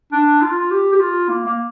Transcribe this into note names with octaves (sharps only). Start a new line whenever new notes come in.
D4
F4
G4
G4
F4
A#3
A#3